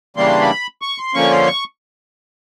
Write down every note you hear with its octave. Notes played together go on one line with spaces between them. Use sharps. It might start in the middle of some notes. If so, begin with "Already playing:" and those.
C#3 E3 G3 A#3 D4 C6
B5
C#6
C6
D3 F3 A#3 C#4 C#6
C6
C#6